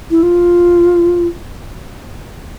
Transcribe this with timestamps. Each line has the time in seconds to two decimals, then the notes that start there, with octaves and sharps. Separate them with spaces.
0.11 E4
0.23 F4